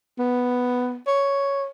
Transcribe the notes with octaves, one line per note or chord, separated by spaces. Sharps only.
B3
C#5